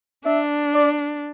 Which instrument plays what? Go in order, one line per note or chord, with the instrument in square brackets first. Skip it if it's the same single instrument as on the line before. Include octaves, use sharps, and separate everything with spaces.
[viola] D4 [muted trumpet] E5
[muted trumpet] D5